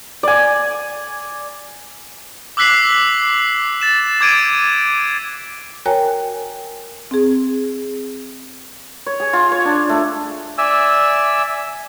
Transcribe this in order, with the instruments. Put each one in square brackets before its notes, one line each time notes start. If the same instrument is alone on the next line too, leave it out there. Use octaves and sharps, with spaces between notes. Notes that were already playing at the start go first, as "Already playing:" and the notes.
[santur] D5 G#5
[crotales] D6 E6 F#6 B6 C7 F#7
A6 E7
D6 G#6 D7 D#7
[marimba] F#4 A#4 C#5 G5 G#5 A#5
C4 G#4
[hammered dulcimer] C#5
G#4
F4
C#5
D4
A3
[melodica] D5 E5 G#5 E6